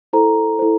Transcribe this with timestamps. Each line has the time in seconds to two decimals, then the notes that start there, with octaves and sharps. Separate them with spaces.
0.13 E4 A4 C5 A#5
0.59 E4 A4 C5